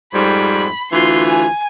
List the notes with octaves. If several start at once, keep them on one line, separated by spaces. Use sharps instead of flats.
F2 G#2 G3 B5
D2 E3 F4 C6
G#5